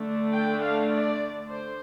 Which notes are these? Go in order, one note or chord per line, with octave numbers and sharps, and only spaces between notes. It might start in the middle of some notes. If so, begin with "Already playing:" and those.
Already playing: D3 A3 D4
G5
F5
D5
C5